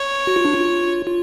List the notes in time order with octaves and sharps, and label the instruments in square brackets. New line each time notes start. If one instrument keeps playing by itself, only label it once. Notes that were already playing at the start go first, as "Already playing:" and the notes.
Already playing: [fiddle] C#5
[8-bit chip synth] F#4
F4
D4
F4
F4